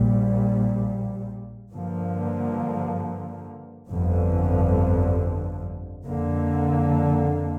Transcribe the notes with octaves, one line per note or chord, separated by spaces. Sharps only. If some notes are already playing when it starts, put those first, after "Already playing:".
Already playing: A#1 A#2 G3
G2 D3 F3 A#3
G1 F2 D3 F3
F2 D3 A#3